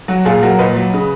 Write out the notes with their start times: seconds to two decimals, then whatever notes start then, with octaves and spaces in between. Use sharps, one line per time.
0.08 F#3 F#4
0.25 A#2 F4 G#4
0.42 F#3 F#4 A#4
0.59 A#2 B4 D#5
0.76 F#3
0.94 C#3